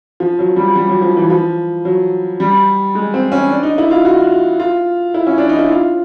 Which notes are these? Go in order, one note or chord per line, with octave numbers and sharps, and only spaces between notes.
F3
F#3
G3
G3
F#3
F3
E3
F3
F#3
G3
G#3
C4
C#4
D4
D#4
E4
F4
F#4
F4
E4
C#4
D4
D#4
E4
F4